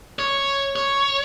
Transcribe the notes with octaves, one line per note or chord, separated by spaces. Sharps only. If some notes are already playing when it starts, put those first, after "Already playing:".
C#5
C#5